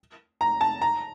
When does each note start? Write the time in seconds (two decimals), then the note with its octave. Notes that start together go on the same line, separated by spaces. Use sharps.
0.41 A#5
0.61 A5
0.82 A#5